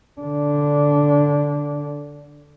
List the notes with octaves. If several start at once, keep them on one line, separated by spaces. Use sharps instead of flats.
D3 D4